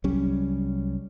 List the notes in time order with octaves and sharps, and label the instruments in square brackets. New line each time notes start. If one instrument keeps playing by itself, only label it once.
[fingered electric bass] C2 F#3 G3 C#4